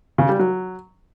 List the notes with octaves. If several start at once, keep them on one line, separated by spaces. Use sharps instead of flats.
C#3
G3
F#3